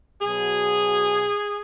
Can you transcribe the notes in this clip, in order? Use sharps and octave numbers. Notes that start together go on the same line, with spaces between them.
B2 F#3 G#4